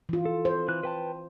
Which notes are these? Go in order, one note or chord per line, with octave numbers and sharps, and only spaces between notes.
E3 F4
A4
C5
E3 F#6
B4 G5 A5